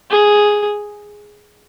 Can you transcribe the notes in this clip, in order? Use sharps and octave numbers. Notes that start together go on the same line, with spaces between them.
G#4